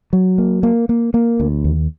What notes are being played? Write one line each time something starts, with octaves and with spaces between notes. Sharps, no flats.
F#3
A#3
A#3
A#3
A#3
D2
D#2